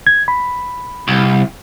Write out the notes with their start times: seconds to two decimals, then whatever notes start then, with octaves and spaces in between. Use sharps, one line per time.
0.07 G#6
0.28 B5
1.08 C2